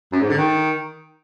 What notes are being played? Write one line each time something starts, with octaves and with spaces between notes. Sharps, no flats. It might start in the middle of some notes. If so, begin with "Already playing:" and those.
F#2
G#2
D3
D#3